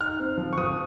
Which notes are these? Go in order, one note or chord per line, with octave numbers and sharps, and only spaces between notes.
D#4 F6
C4
F3
C#6
F3 D#6